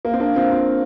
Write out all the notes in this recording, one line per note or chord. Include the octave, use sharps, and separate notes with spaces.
A#3
C4
A#3 D4
C4 F4
C4 F4